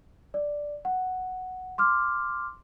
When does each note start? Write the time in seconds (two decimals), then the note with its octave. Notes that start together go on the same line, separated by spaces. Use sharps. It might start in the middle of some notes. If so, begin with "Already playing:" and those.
0.34 D5
0.85 F#5
1.78 C6 D6 F6